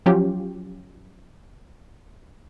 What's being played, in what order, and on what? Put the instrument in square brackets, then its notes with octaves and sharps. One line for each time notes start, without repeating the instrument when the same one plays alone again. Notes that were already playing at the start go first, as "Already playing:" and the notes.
[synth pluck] F3 F#3 C#4 F4 G4